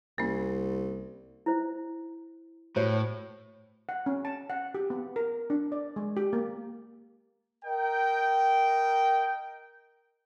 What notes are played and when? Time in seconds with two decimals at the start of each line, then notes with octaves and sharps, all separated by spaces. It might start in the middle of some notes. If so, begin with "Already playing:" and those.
0.18 C2 A#3 C#4
1.46 E4 C5
2.76 A2 F#4 C5 C#5
3.89 F#5
4.06 C#4
4.25 A5
4.50 F#5
4.74 G4
4.90 B3
5.16 A#4
5.50 D4
5.72 D5
5.96 G#3
6.17 G4
6.33 A#3
7.65 A#4 D#5 G5